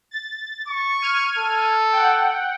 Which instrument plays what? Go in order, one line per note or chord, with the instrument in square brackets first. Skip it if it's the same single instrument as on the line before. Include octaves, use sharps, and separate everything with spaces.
[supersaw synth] A6
[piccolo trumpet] C#6
[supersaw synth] F6 G#6 D#7
[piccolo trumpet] A4
[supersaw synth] F#5 G5